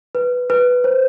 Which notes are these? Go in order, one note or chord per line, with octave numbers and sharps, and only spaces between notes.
B4
B4
C5